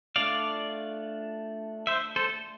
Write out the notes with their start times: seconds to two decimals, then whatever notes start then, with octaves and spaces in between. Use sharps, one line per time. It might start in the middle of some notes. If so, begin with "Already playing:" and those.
0.16 A3 D4 F4 D5 F5
1.87 C5 E5
2.16 A4 C5